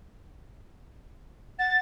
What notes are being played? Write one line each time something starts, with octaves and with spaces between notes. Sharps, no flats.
F#5 A6